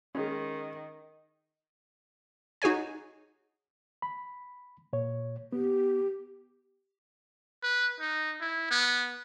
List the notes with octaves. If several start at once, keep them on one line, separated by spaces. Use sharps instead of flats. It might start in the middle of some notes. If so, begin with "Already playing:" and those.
D#3 G#3 C#4
D#4 F#4 G#4 C#5 G#5
B5
A#2 C#5
B3 G4
B4
D#4
E4
B3